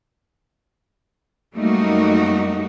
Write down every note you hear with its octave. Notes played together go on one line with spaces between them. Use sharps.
F#2 G3 A3 A#3 D#4 F#4